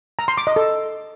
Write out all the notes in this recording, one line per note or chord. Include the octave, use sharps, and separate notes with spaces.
A#5
C6
D6
D#5
A4